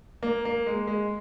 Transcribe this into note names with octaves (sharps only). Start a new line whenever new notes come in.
A#3
A#3
G#3
G#3